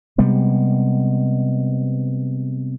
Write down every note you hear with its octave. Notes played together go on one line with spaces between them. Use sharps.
C3 G3 G#3 B3